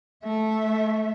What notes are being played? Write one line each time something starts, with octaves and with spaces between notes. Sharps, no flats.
A3 E5